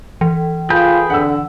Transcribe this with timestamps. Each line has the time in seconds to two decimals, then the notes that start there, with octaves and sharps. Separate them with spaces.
0.21 E3
0.70 F4 G#4 B4 G5
1.10 D3 F#5 E6